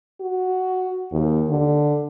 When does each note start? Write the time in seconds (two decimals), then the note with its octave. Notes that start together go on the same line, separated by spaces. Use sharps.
0.20 F#4
1.12 D#2
1.49 D3